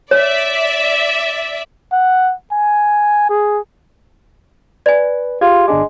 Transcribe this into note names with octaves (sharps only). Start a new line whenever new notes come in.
C#5 D5 E5
F#5
G#5
G#4
B4 D5 G#5
F4 G4 G#4 G#6
G1 G#3 D4 D6